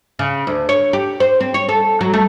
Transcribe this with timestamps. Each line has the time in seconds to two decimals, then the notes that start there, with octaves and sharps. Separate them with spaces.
0.19 C#3
0.47 D2
0.69 C#5
0.93 G4
1.20 C5
1.41 C4
1.54 C#5
1.69 A4
2.01 F#3
2.13 A3